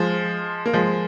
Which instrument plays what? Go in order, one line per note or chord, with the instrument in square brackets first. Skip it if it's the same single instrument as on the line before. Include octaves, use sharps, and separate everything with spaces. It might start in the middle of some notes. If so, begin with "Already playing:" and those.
Already playing: [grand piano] F3 G#3
A#3
F3 G#3